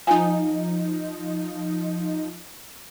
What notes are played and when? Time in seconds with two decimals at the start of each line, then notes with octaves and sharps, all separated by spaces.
0.07 F3 D#4 G#5